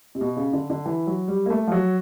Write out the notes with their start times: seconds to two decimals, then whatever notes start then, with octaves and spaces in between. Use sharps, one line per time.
0.15 C3
0.21 B2
0.37 C#3
0.53 D3
0.70 D3
0.86 E3
1.07 F#3
1.28 G3
1.46 A#3
1.50 A3
1.67 F3
1.72 F#3